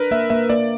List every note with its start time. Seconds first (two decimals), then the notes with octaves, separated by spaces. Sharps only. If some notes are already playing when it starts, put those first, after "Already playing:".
Already playing: D4 A#4 B4
0.11 A#3 E5
0.30 A#3 E5
0.50 A#3 D5